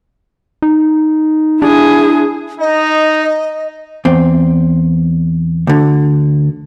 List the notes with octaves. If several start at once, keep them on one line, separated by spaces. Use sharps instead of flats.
D#4
D4 E4 G#4
D#4 D#5
E2 C4
D2 D3